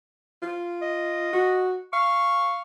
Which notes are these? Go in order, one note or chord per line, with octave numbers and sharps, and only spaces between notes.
F4
D#5
F#4
F5 C#6